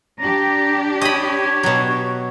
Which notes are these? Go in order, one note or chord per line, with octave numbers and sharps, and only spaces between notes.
D4 G4 A#5
C#5 D#5 B5
B2 F#3